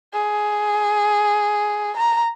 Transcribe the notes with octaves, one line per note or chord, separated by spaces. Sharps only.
G#4
A#5